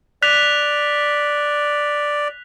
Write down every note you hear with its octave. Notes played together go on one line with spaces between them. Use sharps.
D5 F#6 B6 F7